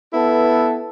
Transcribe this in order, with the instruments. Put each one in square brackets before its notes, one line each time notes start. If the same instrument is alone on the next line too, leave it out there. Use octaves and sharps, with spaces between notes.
[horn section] B3 E4 A4